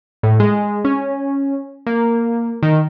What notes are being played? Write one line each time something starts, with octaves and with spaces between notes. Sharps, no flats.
A2
G#3
C#4
A#3
D#3